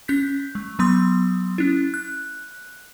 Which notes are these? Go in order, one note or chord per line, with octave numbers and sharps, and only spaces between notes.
C#4 G6 B6
G#3
F#3 B3 C6 D#6
C#4 E4
F#6